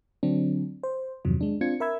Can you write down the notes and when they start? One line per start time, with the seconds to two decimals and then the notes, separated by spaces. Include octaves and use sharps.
0.23 D3 F#3 C4 D4
0.83 C5
1.25 E2 G2 C3 D#3 F3 F#3
1.41 G#3 D4
1.61 C4 D4 F4 G#6 C#7
1.80 A#4 E5 B5 E6 G#6